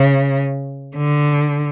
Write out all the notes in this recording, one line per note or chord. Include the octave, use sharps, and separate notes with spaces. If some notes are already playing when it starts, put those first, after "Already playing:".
Already playing: C#3
D3